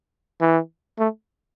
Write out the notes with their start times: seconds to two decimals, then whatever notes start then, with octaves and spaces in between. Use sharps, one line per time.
0.41 E3
0.99 A3